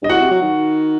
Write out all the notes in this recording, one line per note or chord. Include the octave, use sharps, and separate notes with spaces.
G2 D#5
A2 F#4 F#5
C3
F#3
D#3